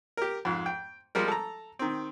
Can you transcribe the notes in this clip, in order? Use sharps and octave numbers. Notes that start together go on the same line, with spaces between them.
G4 A#4
F2 G#2
G5
F3 G3 G#3 A#4
A4 A#5
D#3 C4